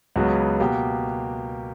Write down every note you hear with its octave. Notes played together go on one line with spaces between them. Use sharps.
C#2 C#3 F#3 B3 F#4
B2 A#3 G4